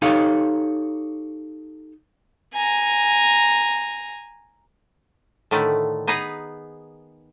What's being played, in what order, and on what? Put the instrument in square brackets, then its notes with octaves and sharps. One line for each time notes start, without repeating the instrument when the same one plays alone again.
[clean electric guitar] D#4 G4 A4 C#5 F5
[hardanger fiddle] G#5 A#5
[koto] A2 D3 D#3 A3
B3 D#4 G#4 B4 A#5